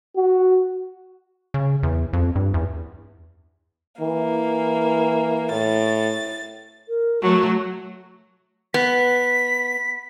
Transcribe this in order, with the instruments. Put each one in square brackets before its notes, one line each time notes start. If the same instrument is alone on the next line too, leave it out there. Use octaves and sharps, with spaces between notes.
[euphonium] F#4
[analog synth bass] C#3
E2
F2
G2
E2
[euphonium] E3 [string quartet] A#3
[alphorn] A2 [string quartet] A6
[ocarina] A#4
[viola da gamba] F#3 A3 [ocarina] F#4
[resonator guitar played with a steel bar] B3 [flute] B6